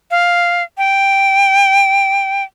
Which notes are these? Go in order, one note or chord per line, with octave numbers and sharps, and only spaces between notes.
F5
G5